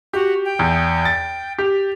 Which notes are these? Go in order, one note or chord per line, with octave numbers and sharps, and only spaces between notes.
F#4 G4
G5
E2
A6
G4